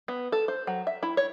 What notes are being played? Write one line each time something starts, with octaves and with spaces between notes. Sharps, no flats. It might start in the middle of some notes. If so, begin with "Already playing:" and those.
B3
A4
C5
F#3
E5
E4
C#5